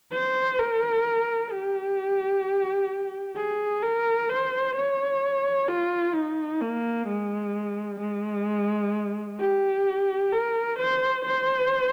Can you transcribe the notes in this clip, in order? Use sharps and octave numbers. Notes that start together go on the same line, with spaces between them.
C5
A#4
G4
G#4
A#4
C5
C#5
F4
D#4
A#3
G#3
G#3
G4
A#4
C5
C5